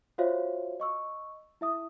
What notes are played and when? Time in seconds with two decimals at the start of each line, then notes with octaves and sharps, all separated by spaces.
0.18 F4 F#4 C5 C#5 E5 F5
0.80 D#5 C#6 E6
1.61 E4 E5 D#6